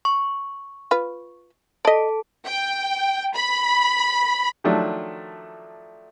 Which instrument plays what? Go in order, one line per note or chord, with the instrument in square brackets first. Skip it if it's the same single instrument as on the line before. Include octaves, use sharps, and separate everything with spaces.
[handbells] C#6
[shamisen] F4 B4
[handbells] A4 A5 [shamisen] D5 D#5
[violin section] G5
B5
[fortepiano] D#3 F3 F#3 A3 D4